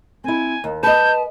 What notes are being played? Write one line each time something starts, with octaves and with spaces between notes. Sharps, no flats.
C4 E4 G#5
D#2
B4 D#5 A5 G6